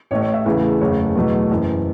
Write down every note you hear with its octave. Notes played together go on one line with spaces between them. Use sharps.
A1 A2 A3 C#5
C#5
E5
E2 C#3 E3 A3
F#1 E2 C#3 A3 C#5
E2 B2 F#3 A3
F#1 F#2 E3